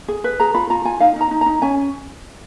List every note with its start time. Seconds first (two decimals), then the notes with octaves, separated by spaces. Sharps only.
0.08 G#4
0.24 B4
0.40 G#4 A#5
0.55 F4 B5
0.70 F4 A#5
0.85 F4 G#5
1.00 D#4 F5
1.16 D#4 A#5
1.31 D#4
1.41 A#5
1.46 D#4
1.62 C#4 G#5